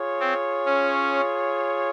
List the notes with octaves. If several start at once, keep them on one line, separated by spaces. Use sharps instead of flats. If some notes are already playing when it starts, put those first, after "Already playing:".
Already playing: F4 G#4 C#5
C4
C#4